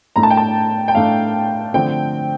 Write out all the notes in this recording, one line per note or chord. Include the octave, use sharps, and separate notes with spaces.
A2 A3 D4 A#5
A5
G5
A5
G5
A2 A3 D4 F5
D3 F3 A3 C4 G5